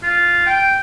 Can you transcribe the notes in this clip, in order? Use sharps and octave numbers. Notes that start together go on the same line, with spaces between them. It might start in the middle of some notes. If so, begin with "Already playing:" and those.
F4
G5